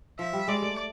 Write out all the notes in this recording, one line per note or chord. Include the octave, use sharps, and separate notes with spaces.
F3 E5
G3
G#3 D5
A3